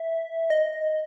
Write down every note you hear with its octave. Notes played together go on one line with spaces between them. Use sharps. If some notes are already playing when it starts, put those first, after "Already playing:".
Already playing: E5
D#5